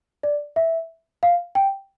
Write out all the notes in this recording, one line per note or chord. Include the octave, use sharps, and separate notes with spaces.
D5
E5
F5
G5